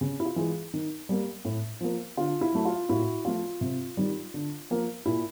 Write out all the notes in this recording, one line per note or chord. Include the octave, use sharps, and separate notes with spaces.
C#3
E4
F4
E3 G#3
D#3
G3 A#3
A2
F3 A#3
D3 F4
E4
F#3 A3
F4
A2 E4 F#4
F3 A3 F4
C3
D#3 G3
D3
F3 A#3
A#2 E4